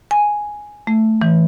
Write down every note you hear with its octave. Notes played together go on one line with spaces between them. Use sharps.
G#5
A3
E3